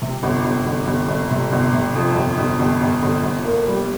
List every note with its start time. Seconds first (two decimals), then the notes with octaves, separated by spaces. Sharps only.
0.02 C3
0.23 G1
0.44 G1
0.66 G1
0.87 G1
1.08 G1
1.31 C3
1.52 G1
1.73 C3
1.95 F2
2.16 G1
2.38 G1
2.59 G1
2.81 G1
3.02 G1
3.23 G1
3.44 A#3
3.67 G3